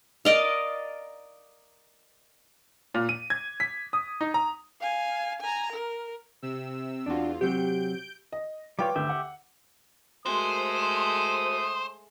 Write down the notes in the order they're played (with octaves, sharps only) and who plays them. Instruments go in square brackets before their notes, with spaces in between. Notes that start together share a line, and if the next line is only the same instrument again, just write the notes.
[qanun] A#4 D5 D#5 F5
[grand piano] A#2
D#7
G#6
B6
D#6
D#4
A#5
[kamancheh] F5 G#5
G#5 A#5
A#4
[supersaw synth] C3 E6
[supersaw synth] E2 F4 [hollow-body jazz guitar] D4 F#4
[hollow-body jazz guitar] C3 F#3 C4 [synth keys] G4 [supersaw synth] G6 D7
[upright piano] D#5
[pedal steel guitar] G3 F4 C#5 [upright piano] B4 G5 D6
[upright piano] D2 [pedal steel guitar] G4 E5 G5
[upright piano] F#5
[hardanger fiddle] G#3 A3 [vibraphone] F#4 A#4 C6 [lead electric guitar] C5 [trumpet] D#6